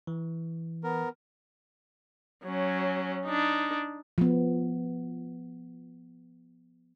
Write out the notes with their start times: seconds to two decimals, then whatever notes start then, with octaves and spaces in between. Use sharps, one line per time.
0.07 E3
0.84 B3 A#4
2.44 F#3 C#4
3.26 D4 D#4
4.18 F3 B3